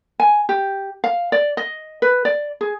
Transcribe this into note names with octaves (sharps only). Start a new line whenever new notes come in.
G#5
G4
F5
D5
D#5
B4
D5
G#4